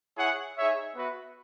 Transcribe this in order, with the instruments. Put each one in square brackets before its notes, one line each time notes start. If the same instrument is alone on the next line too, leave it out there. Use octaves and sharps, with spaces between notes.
[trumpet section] E4 G#4 C#5 F#5
D#4 G#4 C#5 E5
B3 F#4 B4 E5